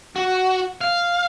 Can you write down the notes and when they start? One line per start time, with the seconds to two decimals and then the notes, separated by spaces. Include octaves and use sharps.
0.16 F#4
0.81 F5